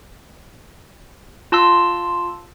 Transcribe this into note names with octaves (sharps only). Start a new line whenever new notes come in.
F4 A5 C6 E6